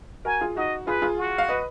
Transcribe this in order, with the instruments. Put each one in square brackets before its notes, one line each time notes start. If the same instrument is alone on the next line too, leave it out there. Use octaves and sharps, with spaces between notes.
[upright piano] F#4 A#4 [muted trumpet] G#5
[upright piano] F4 G#4
[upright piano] D#4 F#4 [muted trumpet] D#5
[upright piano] F4 G#4 [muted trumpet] B4
[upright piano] F4 G#4
[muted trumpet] F#4
[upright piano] F5
B4 D#5